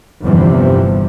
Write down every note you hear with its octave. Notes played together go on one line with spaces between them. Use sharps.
G1 E2 C3 E3 F3 G3